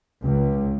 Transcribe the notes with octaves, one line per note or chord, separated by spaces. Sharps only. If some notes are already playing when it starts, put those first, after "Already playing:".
C#2